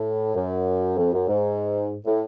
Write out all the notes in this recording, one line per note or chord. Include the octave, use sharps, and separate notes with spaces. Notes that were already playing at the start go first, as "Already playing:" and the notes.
Already playing: A2
F#2
F2
F#2
G#2
A2